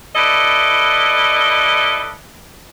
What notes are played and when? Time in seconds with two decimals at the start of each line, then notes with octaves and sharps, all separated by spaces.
0.16 E4 A4 B4 D5 D#5